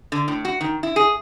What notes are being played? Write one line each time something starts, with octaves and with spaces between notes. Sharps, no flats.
D3
A2
F#4
D#3
E4
G#4